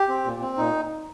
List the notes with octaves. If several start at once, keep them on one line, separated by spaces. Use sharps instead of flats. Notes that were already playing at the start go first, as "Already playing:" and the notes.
Already playing: G4
C4
A#2
C4
A#2 D#4